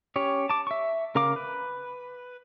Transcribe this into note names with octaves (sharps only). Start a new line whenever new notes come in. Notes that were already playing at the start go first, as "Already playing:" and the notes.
C#4 G4 C#5
A5 D6
E5 C#6
C#3 A#4 F5 D6
B4